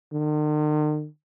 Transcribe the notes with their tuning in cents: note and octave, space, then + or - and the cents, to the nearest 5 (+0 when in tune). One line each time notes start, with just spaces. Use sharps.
D#3 -45